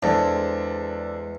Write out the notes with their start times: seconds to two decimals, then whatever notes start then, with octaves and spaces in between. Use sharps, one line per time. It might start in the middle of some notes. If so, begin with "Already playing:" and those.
0.03 E2 G#3 D4 A4 C5